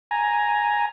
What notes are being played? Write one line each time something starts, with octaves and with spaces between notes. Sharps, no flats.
G#5 A#5